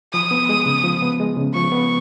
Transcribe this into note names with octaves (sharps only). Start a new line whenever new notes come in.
F3 D#6
B3
G#3
C#3
F3
B3
G#3
C#3
F3 C#6
B3